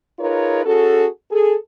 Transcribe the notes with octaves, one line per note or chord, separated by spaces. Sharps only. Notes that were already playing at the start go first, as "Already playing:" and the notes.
D#4 F4 G#4 A#4 B4 C#5
C#4 F#4 G#4 A4
G#4 A4